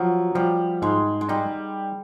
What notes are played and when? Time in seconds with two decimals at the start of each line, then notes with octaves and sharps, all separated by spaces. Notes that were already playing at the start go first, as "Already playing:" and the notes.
Already playing: F3 F#3
0.35 F3 G3
0.82 G#2 G#3
1.21 G#3
1.29 G3 D#4